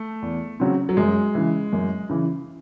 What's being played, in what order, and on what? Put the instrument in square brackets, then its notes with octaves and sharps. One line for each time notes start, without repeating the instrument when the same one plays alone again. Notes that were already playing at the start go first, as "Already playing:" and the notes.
Already playing: [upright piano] A3
[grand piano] E2
C#3 F#3 C4
[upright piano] F#3
[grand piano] F#2 [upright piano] G#3
[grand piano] C#3 E3
F#2
C#3 E3